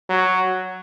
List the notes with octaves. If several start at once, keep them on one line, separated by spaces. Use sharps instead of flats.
F#3